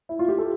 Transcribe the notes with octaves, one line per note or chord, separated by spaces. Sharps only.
E4
F4
G4
A4